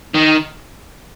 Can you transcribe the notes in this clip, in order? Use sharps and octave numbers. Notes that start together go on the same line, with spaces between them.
D#3